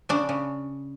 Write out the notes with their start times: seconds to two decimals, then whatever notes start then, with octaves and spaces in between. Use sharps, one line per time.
0.09 C#3 D4
0.29 C#3